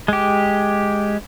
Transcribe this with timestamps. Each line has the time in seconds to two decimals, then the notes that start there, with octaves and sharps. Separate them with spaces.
0.08 G#3 G4